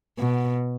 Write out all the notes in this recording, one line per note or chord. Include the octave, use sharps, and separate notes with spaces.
B2